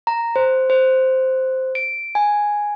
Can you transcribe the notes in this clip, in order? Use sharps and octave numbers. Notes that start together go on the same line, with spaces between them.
A#5
C5
C5
D7
G#5